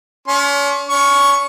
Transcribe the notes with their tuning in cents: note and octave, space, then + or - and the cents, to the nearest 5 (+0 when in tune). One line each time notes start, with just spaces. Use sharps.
C#4 +35 C6 +45
C#4 +35 C#6 +0